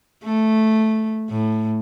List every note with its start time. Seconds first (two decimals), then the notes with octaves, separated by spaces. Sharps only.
0.23 A3
1.30 A2